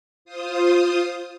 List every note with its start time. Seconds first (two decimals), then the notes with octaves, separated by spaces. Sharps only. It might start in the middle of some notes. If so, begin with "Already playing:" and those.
0.25 F4 C5 D#6